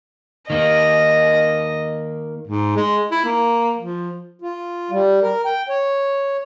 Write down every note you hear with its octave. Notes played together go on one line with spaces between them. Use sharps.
D#3 A#3 D#5
G#2
G#3
E4
A#3
F3
F4
G3
A#4
G5
C#5